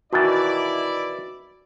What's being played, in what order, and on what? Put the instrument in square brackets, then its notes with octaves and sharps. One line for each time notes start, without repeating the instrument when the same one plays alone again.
[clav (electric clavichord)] B2 D#3 E3 [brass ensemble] E4 D5 [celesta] F#4 A6